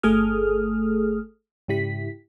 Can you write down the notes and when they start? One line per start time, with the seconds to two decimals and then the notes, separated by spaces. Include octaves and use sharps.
0.03 G1 A3 G#4 A4 D#6 F6
1.68 G#2 C#3 E4 G4 B6